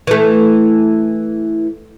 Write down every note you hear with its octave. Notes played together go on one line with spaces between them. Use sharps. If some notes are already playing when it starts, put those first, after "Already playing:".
E3 A3